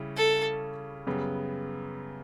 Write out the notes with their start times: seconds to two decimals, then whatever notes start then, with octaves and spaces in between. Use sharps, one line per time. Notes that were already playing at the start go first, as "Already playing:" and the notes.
Already playing: C#3 G3 C#4 E4
0.17 A4
1.07 F#2 C#3 G3 B3